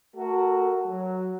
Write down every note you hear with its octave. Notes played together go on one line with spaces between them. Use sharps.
A3 F#4 A4 A#4
F#3